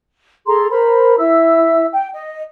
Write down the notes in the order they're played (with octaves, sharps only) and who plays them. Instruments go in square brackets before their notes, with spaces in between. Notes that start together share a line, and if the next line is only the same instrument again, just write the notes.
[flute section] G#4 A4 A#5 C6
A#4 C5 A#5 B5
E4 E5 E6
G5
D#5